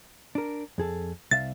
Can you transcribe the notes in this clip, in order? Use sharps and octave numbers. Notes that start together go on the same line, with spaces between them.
D4 A#4
F2 G#4 A4
C2 E5 F5 A6